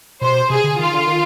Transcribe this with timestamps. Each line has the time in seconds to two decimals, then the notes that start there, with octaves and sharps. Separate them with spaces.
0.21 B2 C5
0.50 C3 G#4
0.64 D3
0.79 D#3 F4
0.93 D3
1.07 D#3